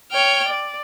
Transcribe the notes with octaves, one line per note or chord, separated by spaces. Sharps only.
C#5 G5 F6
D5